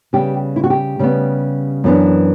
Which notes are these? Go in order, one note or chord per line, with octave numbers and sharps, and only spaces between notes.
C#3 G3 B3 G4
E4
F#4
G4
C#3 G3 B3
F#2 E3 B3 D4